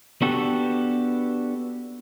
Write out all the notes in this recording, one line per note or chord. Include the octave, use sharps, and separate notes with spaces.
B3 D4 F#4 G4 A4